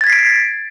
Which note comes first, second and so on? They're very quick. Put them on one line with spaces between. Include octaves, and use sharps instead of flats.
A6 G#6 B6 C7 D7